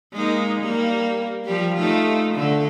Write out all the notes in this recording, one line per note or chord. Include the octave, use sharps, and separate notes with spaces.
G#3 A#3 D#4
G3 A#3
F3 G3 G4
A3 D#4 F4
D3 A3 A4